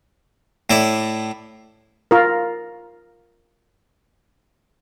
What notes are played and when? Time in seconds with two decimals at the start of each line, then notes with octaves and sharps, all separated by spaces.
0.70 A2 E4 D5
2.11 F4 A#4